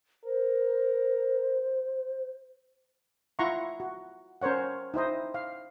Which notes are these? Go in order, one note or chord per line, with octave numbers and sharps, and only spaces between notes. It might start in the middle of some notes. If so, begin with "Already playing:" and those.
A#4 C5
E4 F4 F#5 A#5 C6 C#6
F#4
C#4 A#4 C5 C#5 F#5
D#4 E4 C5 D#5
F5